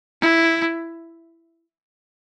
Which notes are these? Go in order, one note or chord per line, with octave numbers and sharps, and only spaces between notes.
E4